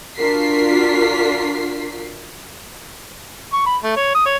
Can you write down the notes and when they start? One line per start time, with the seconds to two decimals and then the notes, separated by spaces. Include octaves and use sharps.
0.16 D4 F4 F#4 A#4 B6 C7
3.53 C#6
3.66 B5
3.83 A3
3.97 C#5
4.14 D#6
4.26 C#5